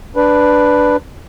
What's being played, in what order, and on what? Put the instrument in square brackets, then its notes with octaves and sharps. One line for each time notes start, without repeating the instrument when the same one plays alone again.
[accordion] D4 B4